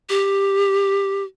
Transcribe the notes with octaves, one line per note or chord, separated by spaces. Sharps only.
G4